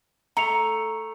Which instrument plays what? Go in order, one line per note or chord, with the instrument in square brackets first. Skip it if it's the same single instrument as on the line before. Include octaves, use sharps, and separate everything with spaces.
[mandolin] A3 [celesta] A#5 C#7 F7